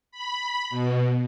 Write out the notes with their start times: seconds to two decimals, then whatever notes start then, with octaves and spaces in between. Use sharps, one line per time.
0.12 B5
0.70 B2